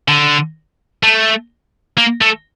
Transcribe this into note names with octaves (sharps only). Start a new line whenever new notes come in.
D3
A3
A#3
A3